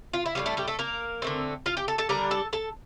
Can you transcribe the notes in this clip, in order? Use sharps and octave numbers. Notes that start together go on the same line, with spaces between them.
F4
E4
A2 E3 G3 F4
A3 A4
G3 G4
A3 A4
A#3 A#4
D3 A3 C4
F4 F5
G4 G5
A4 A5
A4 A5
D3 G3 D4 A#4 A#5
A4 A5
A4 A5